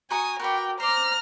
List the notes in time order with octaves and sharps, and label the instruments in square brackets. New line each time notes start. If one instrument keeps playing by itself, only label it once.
[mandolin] F#4 A#5 C#6 [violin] G#5 D#6
[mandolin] F#4 B4 D5 [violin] A#4 G5
[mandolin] C5 D5 [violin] A#5 F6